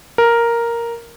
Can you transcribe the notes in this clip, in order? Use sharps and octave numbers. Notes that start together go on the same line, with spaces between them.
A#4